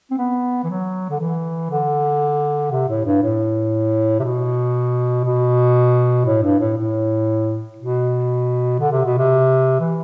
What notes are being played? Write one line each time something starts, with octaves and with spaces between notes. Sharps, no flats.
C4
B3
E3
F#3
D3
E3
D3
C3
A2
G2
A2
C3
B2
B2
A2
G2
A2
A2
B2
D3
C3
B2
C3
E3